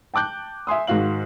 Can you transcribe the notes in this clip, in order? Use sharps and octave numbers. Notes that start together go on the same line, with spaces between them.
G5 A5 D6 F#6 G6
E5 G#5 C6 D#6
G#2 D#3 F#4 F5 F#7